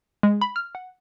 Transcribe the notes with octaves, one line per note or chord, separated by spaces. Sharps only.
G#3
B5
F6
F#5